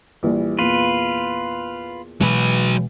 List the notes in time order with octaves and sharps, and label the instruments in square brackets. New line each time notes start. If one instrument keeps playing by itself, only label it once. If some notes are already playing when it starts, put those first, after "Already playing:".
[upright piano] A#1 E3 G3
[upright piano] E2 A#2 [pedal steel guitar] F4 B4
[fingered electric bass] B2 E3 G#3 [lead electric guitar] F#3 B4